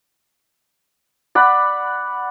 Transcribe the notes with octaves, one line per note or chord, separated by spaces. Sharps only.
D5 F#5 B5